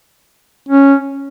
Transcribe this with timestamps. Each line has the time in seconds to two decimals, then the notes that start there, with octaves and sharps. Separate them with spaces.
0.69 C#4